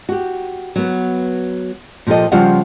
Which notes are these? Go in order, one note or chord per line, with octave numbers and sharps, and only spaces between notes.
F#4 G4
F#3 B3
A#2 F3 G4 A4 D#5
C#3 F3 G3 F4 F5 F#5